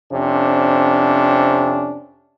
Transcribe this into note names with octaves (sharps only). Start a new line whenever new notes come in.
F2 C3 C#4 D4